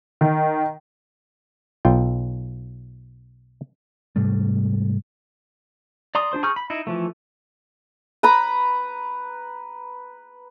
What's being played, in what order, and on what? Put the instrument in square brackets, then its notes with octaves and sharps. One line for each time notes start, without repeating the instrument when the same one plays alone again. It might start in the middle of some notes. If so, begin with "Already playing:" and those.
[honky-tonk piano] D#3
[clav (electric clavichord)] B1 F4 G5
[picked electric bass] G#2 C3 G3 A3
[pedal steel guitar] D5 A#5 C6 D#6
D4 F4 C5 C6
G#4 A#5 C#6 F6 G6
B5
D#4 E4
E3 F3 A3
[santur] B4 A#5 B5